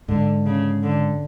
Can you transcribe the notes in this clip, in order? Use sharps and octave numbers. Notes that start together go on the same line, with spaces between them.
G#2 D3
C#3
D3